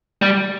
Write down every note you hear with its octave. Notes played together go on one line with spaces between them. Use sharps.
G3